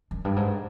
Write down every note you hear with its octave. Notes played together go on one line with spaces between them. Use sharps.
F#2
G2
G#2